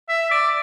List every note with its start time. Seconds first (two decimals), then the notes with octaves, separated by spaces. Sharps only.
0.09 E5
0.31 D5